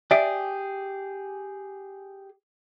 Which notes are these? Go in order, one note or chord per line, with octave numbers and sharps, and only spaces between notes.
G4 G#4 D5 E5 D7